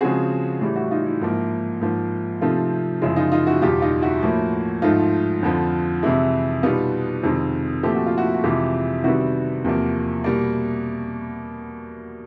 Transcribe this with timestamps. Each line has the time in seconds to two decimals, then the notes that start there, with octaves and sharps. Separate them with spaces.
0.01 C#3 F3 G#3 C4 F#4 G#4
0.61 A2 E3 G3
0.76 E4 F#4
0.91 D#4 F4
1.06 E4
1.21 G#2 F3 A#3
1.81 G#2 F3 A#3
2.41 C3 F3 A3 C4 D#4 F4
3.02 F#2 C#3 F3 G#3 E4
3.16 D#4 F4
3.32 D#4 F4
3.47 E4 F#4
3.62 E2 B2 G3 F4 G4
3.82 D#4 F4
4.02 E4 F#4
4.22 A2 F3 A#3
4.82 G#2 F3 A3 D#4 F4
5.43 F2 D3 F3
6.03 F2 C3 E3 G#3 E4
6.63 B2 G3 B3 D#4 F4
7.23 F2 C3 D#3 G#3 C4
7.83 A#2 F3 A3 C4 G4
7.95 F#4
8.07 F4
8.18 E4 F#4
8.34 F#4
8.44 F2 C3 E3 G#3 F4 G4
9.04 C3 D#3 G3 B3 E4 F#4
9.64 E2 C3 F3 A#3
10.24 B2 G3 A#3